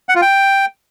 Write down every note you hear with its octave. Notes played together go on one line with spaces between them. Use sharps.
F#5
F4
G5